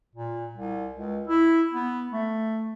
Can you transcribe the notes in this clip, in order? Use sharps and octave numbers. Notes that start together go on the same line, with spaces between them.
A#2
C2
C#2
E4
B3
A3